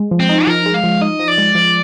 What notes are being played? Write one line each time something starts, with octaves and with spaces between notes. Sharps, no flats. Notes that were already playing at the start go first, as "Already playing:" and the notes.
Already playing: G#3
F3
C4
D#4
F3 A#4
G#3
F5
F3
D#4 D#5
F3
D5
G#3
F3